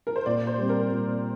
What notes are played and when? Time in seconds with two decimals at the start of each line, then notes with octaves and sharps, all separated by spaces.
0.07 A#4
0.16 C5
0.26 A#2 D5
0.47 C5
0.58 G3 C4
0.69 A#4
0.91 A#2